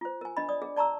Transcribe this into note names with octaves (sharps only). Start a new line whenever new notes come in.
F4 C5
A#4 G#5
D4 D#5 B5
D5 D#6
G#4
D5 A5 A#5 C#6 E6